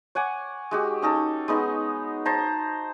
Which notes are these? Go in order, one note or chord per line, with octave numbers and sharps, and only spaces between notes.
C#5 F#5 G#5 D6
G#3 F#4 G4
C#4 D#4 A4
G#3 B3 D#4
C5 A5 A#5